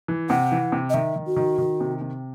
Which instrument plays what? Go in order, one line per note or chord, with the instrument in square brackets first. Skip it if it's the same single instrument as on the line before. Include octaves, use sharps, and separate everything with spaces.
[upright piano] E3
[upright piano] C3 [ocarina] F#5
[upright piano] E3
C3
[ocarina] D#5
[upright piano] D#3 [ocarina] E5
[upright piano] D#3
[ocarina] F#4
[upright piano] D#3
D#3
C3
C3